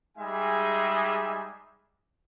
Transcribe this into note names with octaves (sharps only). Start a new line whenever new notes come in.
G3 G#3 D#4 G#4 E5 G#5